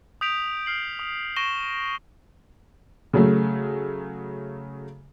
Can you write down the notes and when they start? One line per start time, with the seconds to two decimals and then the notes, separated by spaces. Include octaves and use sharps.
0.21 D#6 G6 B6 D7 F7
0.66 F6 C7 F#7
0.99 D#6
1.36 C#6 A#6 D7 E7 G7
3.13 C#3 F#3 A3